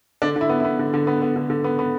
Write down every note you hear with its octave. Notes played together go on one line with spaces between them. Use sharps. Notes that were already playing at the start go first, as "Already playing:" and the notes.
D3 D4
D3 E4
B3
B3 E4
D3
D3
B3
B3
D3
D3
B3
B3